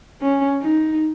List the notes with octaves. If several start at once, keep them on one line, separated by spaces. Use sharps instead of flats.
C#4
D#4